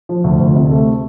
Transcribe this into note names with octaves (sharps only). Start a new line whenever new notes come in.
F3
D2
D2
C3
A3